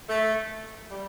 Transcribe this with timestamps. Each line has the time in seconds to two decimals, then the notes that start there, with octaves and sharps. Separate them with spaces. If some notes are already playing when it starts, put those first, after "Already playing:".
0.08 A3
0.90 G3